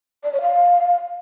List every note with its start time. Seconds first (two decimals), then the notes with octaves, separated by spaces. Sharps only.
0.24 D5
0.33 C#5
0.42 F5